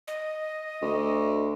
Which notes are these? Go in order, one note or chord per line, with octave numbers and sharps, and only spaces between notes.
D#5
D2